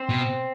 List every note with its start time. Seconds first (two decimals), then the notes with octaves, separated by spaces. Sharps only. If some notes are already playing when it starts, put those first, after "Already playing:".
Already playing: C4 C5
0.09 B2